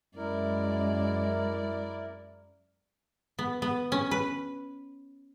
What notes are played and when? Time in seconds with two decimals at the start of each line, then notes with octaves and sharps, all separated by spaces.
0.17 F#2 G#3 E4 A#4 D5
3.39 B3
3.62 B3
3.92 C#4
4.11 B4